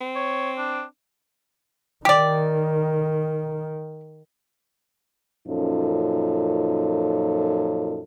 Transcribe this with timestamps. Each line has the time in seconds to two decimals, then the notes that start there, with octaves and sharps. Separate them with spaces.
0.01 C4
0.16 C#5
0.58 D4
2.05 D#3 G4 D5
5.46 F#2 A#2 F3 C#4 D#4 A4